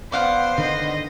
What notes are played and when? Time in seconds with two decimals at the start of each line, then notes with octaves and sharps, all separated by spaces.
0.12 B3 C5 D5 F5 F#5
0.58 D3 D#3 D4 D#5